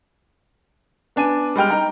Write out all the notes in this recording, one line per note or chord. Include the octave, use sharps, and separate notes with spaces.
B3 D4 G#5 D#7
G3 G#3 G5 F6
D#4 G5 A#5